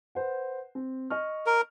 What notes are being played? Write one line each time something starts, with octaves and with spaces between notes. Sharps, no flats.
B4 C5 F#5
C4
D#5 C#6 F6
A#4